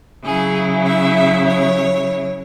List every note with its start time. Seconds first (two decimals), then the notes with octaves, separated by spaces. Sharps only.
0.24 C#3 F#3 E4 G#4
0.85 E5
1.16 E5
1.46 C#5